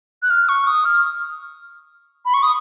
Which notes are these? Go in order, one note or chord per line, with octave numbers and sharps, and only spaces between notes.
F#6
F6
C#6
D#6
F6
B5
C#6
D#6